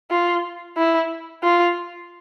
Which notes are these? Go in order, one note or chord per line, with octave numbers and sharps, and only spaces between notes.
F4
E4
F4